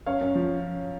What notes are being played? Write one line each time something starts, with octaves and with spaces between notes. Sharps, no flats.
F#2 C#5 F5
F#2
F3